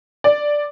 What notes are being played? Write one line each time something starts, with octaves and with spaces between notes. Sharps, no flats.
D5